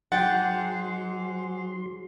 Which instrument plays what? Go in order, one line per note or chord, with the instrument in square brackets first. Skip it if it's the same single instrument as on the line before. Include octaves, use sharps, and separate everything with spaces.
[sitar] G#2 [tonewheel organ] F#3 C6 [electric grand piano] F#5 [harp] G5 A6